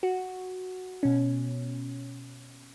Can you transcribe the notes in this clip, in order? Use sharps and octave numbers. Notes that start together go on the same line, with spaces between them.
F#4
B2 C#4